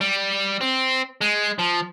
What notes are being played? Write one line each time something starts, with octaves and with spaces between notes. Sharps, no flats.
G3
C4
G#3
F3